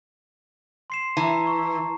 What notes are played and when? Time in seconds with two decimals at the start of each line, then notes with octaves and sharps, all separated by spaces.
0.90 C6 C7 E7
1.17 E3 A5 A#5
1.47 C#6